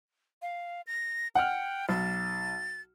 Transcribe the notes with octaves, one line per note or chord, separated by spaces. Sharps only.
F5
A#6
F#5 G5 F6
B1 A6